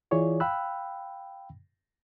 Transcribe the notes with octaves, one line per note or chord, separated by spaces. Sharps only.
E3 E4 F4 G#4 C#5 D5
F5 G5 B5 E6 F#6